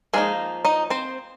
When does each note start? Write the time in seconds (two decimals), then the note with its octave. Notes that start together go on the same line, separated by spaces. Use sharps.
0.14 F3 G#3 A#3 D#4 G#4
0.65 D#4 D#5
0.90 C4 C5